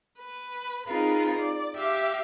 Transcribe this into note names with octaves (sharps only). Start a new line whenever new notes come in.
B4
C4 D#4 F4 G#4 A#4 B4
D5
G4 E5 F5 D6